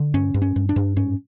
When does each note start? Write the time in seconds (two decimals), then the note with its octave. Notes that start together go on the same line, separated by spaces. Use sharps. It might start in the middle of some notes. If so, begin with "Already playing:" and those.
Already playing: D3
0.14 G2 C#4
0.34 G2
0.42 C#4
0.56 G2
0.69 D4
0.76 G2
0.96 G#2 C#4